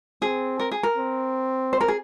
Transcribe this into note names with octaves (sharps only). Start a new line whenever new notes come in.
C4 G#4
A#4
G#4
A#4
C4
C5
A#4
G#4